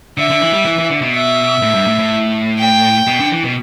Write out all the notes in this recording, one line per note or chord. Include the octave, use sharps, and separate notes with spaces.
D3 E5
D3
E3
G3
E3
E3
D3
B2
E5
A2
G2
A2
A2
G5
B2
D3
E3
B2